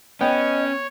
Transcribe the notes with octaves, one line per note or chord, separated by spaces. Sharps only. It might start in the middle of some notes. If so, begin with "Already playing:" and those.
B3 C#4 C#5 D#5 G5